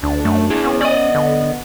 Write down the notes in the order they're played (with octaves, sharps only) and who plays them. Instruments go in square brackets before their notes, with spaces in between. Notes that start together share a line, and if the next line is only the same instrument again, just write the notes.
[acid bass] D2 [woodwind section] D4
[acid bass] F#2 [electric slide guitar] A3
[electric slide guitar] E4 G#4
[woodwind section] B3 [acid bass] C#4
[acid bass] C#4 [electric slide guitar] D5 D#5
[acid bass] D3